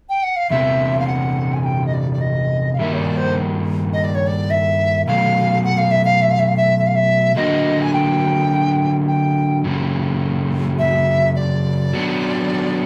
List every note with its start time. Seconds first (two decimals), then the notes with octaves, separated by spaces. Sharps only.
0.09 G5
0.23 F#5
0.36 F5
0.50 E2 C3 E3 E5
0.99 F5
1.07 F#5
1.54 G#5
1.65 G5
1.86 D#5
1.93 D5
2.13 D5
2.21 D#5
2.73 F5
2.79 G2 D#3 G3 A#3 D#4 E5
2.93 C#5
2.98 D5
3.17 C5
3.93 D#5
4.04 D5
4.15 C#5
4.27 D5
4.50 E5
5.08 B2 F#3 A3 F5
5.64 F#5
5.78 F5
5.91 E5
6.05 F5
6.22 E5
6.30 F5
6.39 E5
6.48 F5
6.57 E5
6.79 E5
6.87 F5
6.95 E5
7.36 D3 F#3 A#3 D4 F#4 D#5
7.81 G#5
7.93 G5
9.07 G5
9.64 F#2 C#3 E3
10.79 E5
11.36 D5
11.94 F#3 B3 D4